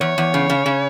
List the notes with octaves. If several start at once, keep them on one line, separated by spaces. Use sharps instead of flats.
E2 C#5
E2
C#3
C#3
C#3